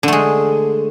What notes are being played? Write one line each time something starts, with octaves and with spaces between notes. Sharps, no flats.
D3 G#3 A3